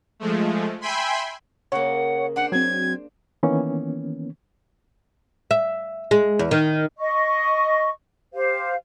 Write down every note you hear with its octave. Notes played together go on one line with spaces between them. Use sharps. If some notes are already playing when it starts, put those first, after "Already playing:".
F3 G#3 A3
E5 G5 G#5 B5 C6
C#3 A#3 C#5 F#5
D4 C5 F#5
F#3 C4 G#6
D#3 E3 A#3 B3 C#4
E5
G#3
E2
D#3
D#5 C#6
G4 C5 F5